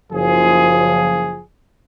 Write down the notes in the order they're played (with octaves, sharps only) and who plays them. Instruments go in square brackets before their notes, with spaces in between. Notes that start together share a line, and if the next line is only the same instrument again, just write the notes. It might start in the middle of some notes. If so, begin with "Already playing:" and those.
[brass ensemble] F#1 F3 G#4